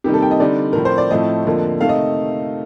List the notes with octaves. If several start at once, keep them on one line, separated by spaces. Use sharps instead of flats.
C3 D#3 G3 A#3 D#4 G4
A4
G5
D#5
D3 G3 C4 D#4 D5
A2 F3 C4 A#4
C5
D5
A2 F3 A3 C4 D#5
F2 D3 F3 A#3
C3 D#3 A3 F5
D#5